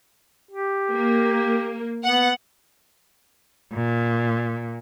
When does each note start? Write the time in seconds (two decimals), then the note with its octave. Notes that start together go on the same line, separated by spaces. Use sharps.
0.51 G4
0.91 A#3
2.04 B3 F#5
3.73 A#2